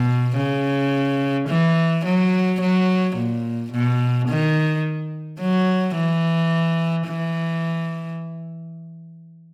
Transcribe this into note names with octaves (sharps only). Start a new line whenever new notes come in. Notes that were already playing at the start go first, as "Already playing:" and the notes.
Already playing: B2
C#3
E3
F#3
F#3
A#2
B2
D#3
F#3
E3
E3